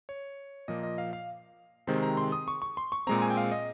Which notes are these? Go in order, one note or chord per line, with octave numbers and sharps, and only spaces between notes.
C#5
A#2 F3 A#3 D#5
D#5
F5
F5
C3 D#3 G#3 C4 C5
A#5
C6
D#6
C#6
C#6
C6
C#6
A#2 G#3 C4 A#5
G#5
G5
F5
D#5